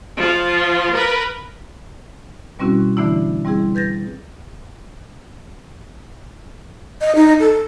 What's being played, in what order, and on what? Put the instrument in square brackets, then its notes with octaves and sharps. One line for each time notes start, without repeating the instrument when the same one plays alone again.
[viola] F3 F4
A#4 B4
[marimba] B2 G3 C4 C#4 E4 F#4
D3 E3 A3 B3 D4 E4
G3 C4 E4 G#4
B4 G6 A6 A#6
[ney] D#5
D#4
A4